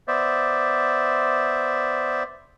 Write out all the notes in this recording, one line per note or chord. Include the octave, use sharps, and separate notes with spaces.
B3 C5 D5 E5